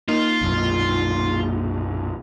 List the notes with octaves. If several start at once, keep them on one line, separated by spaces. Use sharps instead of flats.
A#3 D#4 F4
B1 F#2 A#2